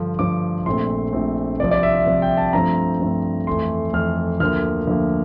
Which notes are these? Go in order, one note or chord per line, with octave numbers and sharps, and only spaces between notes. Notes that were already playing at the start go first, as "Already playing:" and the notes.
Already playing: G2 D3 F3
G2 D3 F3 D6
A#1 A#2 A3 C4 C6
A#1 A#2 A3 C4
C2 C3 F3 D5
D5
E5
E5
C2 C3 F3
G5
A5
G2 F3 A3 C4 A#5
G2 F3 A3 C4
F2 E3 A3 C6
F2 E3 A3 F6
D2 D3 F3 A#3 F6
D2 D3 F3 A#3